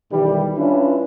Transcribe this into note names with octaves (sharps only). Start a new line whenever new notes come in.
B1 D#3 E3 G3
C#4 D4 E4 F4 B4